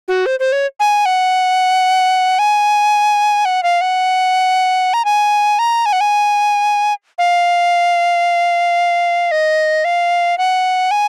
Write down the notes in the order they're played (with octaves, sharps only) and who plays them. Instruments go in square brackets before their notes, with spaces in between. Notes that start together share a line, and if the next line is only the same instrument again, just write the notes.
[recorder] F#4
C5
C5
C#5
G#5
F#5
G#5
F#5
F5
F#5
A#5
G#5
A#5
G#5
F#5
G#5
F5
D#5
F5
F#5
G#5